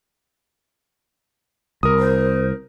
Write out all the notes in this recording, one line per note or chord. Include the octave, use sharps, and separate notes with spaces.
C2 A#4 D#6
C5